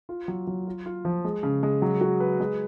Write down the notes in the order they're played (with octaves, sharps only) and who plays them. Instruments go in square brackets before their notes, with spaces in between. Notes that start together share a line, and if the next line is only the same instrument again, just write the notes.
[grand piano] F4
F#3
F#3
F4
F4
F3
G#3
C#3
G#3
F#3
F#4
B4
G#3